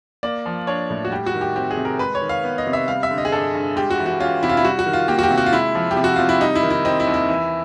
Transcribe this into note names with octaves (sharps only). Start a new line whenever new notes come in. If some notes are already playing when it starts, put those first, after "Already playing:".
A#3 D5
F3
D4 C#5
A2
F#4
G3 G4
F#4
D#3
G4
C4 G4
G#4
C3
A#4
G#3 B4
C#5
D#3
F5
B3
D#5
C3
E5
G3 F5
E5
D3
D#5
G#4
G2 A4
G2
G#3 G4
F#4
E3
F#4
C#4 F4
C3 E4
F4
E4
G3 F#4
F#4
D#3
F4
A#3 G4
F#4
G4
C3
F#4
F4
G#3 E4
F3
G4
C3
F#4
C3 F4
E4
G3 D#4
E4
D#3
E4
C4 D#4
E4
D#2
E4
E3